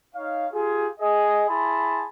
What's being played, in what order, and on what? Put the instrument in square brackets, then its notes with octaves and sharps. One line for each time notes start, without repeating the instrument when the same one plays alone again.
[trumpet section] D#4 C#5 F5
F4 G4 G#4
G#4 D#5
E4 G#4 A5 B5 C6